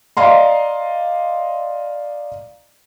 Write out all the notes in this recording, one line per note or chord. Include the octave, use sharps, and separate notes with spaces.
D5 D#5 F5 A#5 C6